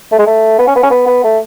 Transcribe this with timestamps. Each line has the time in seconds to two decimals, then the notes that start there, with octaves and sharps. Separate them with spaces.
0.12 A3
0.19 G#3
0.26 A3
0.59 B3
0.67 C#4
0.76 B3
0.83 C#4
0.91 B3
1.07 B3
1.24 A3